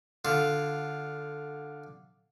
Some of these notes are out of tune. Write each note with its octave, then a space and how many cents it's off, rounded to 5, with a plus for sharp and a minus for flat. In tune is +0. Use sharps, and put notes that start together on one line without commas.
D3 +0 F4 +0